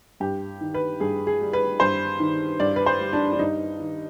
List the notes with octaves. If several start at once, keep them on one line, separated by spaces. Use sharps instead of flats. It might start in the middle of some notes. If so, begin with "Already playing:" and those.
G2 G4
D#3
B4
G2 G#4
G#4
G3
B4
G2 C5
D#3
G2 D5
B4
C5
G3
D4
D4
G2 D#4
D#3